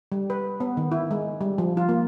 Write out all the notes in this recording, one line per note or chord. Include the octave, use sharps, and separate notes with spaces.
G3
B4
B3
D#3
E4
G#3
G3
F3
F4
A#3